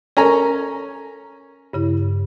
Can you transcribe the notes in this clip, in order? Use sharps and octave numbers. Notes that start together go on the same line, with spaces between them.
C#4 A4 A#4 G#5 A#5
G2 C#3 E4